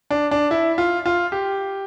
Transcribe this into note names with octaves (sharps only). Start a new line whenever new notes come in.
D4
D4
E4
F4
F4
G4